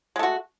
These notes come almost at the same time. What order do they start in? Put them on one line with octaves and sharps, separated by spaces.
G#3 A3 F#4